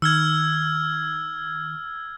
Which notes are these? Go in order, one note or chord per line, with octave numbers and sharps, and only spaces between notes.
D#3 E6 F6 G#6